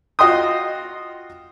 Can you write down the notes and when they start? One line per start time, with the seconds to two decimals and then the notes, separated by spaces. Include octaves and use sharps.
0.19 F4 F#4 D#5 G5 C6 D#6